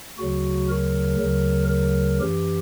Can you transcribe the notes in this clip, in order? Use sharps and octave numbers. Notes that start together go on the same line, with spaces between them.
D2 C#3 F#3 F#4
A#4
D2 C#3 F#3
A#4
F#2 E3 G4